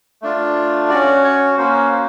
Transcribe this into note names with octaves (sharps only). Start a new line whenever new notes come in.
A3 D4 F4
C#4 F#4 D5
C#5
A#3 C#4 F#4 C5
C5